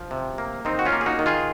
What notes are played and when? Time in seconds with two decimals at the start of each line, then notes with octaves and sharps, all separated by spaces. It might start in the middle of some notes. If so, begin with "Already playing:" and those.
Already playing: F3
0.11 C3
0.38 A#3
0.65 D#3 C4 D#4
0.79 F#4
0.86 C#4 F4
0.92 A#3
1.01 G#4
1.06 D#4 F#4
1.19 D#3
1.26 F4 G#4